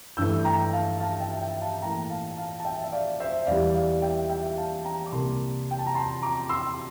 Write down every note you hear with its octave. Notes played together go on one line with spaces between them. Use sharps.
G2 E3 A3 E6 G6
G5 A#5
F5 A5
F5 A5
E5 G5
A5
E5 G5
F5 A5
A2 E3 A#3 G5 A#5
F5 A5
F5 A5
A5
E5 G5
E5
D5 F5
C5 E5
E2 E3 G3 D5 F5
D5 F5
E5 G5
E5 G5
F5 A5
G5 A#5
D6
C2 C3 G3 A#3 A5 C6
G5
A5
A#5
A5 C6
A#5 D6
C6 E6